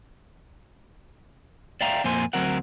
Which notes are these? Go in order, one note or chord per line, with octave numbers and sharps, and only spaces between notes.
D5 E5 F5 G5 A#5
F2 A#2 A#3 C5 G#5 C6
D2 F#3 C4 A#4 F#5